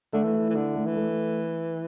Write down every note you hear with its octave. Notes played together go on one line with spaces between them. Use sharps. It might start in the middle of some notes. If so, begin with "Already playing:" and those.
D3 A3
E3
E4
E3
D3 E4
A3
E3
A3